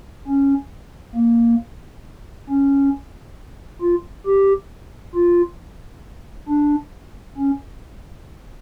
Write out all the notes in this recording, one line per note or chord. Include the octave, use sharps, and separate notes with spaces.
C#4
A#3
C#4
F4
G4
F4
D4
C#4